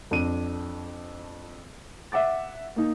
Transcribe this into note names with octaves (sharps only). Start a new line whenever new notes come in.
F2 D4 D#7
E5 F#5 D6 A6
A#3 D#4